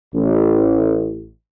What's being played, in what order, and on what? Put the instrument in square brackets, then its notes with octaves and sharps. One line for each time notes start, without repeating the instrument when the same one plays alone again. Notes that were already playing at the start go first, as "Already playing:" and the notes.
[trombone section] A1